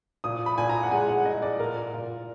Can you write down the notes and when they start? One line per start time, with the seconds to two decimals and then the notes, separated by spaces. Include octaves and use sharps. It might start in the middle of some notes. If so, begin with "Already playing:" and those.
0.24 A#2 D#6
0.46 B5
0.58 A#2 G#5
0.69 A#5
0.83 F#5
0.91 G#3 G#5
1.08 F#5
1.25 G#3 D#5
1.42 D5
1.59 A#2 A#4
1.93 A#2